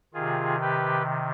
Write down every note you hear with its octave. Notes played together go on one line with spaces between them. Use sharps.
C3 D#3 F4 G#4
G4 B4